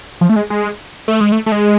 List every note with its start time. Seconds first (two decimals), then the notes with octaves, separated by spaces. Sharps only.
0.21 F3
0.29 A3
0.36 G#3
0.50 G#3
1.08 A3
1.21 G#3
1.32 A3
1.46 A3
1.52 G#3